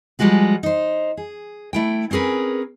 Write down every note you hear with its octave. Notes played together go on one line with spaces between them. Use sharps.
F3 G3 G#3 F#4 G#4
D#4 C5
G#4
A3 E4 G5
C4 C#4 G#4 A#4 B4